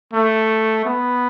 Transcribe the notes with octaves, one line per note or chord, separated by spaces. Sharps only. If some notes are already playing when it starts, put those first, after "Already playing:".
A3
B3